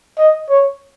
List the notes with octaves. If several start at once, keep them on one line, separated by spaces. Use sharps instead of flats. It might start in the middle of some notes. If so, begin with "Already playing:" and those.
D#5
C#5